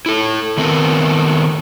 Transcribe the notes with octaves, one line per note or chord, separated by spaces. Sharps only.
E4 A4
D#3 A3 B3 C4 A#4